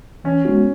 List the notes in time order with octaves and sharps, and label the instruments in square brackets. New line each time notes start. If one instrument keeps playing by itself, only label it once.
[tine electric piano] E3 [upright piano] C#4
[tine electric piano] G#3 B3 D#4 F#4